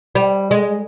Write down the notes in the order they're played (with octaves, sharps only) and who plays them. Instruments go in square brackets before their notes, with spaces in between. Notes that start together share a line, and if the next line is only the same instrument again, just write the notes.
[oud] G3
G#3